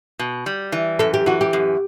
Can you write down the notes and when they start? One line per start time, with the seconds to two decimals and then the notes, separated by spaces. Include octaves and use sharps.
0.19 B2
0.46 G3
0.72 E3
0.99 F#2 A4
1.14 G4
1.26 E3 F#4
1.41 G4
1.53 F#2